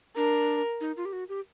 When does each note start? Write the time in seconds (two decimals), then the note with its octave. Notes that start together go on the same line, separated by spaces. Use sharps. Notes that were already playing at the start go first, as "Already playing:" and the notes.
0.16 D4 A#4
0.81 D#4
0.97 F4
1.05 G4
1.13 F#4
1.29 G4